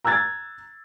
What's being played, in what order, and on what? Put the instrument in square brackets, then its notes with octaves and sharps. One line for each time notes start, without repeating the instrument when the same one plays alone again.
[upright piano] A#5 E6 F#6 G#6 A6